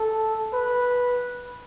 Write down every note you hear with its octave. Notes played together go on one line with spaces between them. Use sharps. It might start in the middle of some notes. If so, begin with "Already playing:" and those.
Already playing: A4
B4